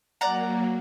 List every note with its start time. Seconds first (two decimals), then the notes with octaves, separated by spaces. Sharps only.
0.21 F#3 A#3 D5 F#5 A#5